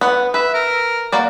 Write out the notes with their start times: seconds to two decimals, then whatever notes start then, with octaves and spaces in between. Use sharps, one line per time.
0.01 B3 F#5
0.34 B4 E5
0.54 A#4
1.12 A#3 F#4 D5